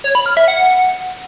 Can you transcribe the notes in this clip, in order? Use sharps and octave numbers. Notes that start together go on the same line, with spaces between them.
C#5
B5
F6
E5
F#5